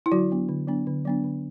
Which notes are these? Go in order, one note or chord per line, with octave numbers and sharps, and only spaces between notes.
E4
D3 F#3 F#4
F#3 B3 D4
D3
F#3 B3 D4
D3
F#3 B3 D4
D3